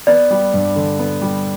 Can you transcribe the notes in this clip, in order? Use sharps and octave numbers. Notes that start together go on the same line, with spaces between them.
B3 D5
G3
G2
D3
B3
G3